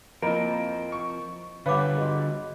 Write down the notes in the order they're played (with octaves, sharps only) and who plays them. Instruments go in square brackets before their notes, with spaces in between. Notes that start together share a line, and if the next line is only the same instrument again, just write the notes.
[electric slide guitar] F3 C4 [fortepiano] A#3 [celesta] E4 D#5 D7 [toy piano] B5
[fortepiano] C#6
[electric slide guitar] D3 G3 [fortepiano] B4 [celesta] C#5 F#5 [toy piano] F5 G#5 D6
[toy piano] F#4 G#4 [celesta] D#5